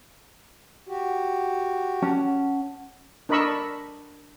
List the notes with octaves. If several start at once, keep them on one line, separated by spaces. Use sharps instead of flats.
F#4 G4
C#4 F#5 A5
D4 A#4 D#5 B5 C#6 E6